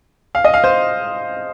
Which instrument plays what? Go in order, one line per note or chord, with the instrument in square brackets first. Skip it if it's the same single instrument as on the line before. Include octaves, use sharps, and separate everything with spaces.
[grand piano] F5
D#5
F5
C5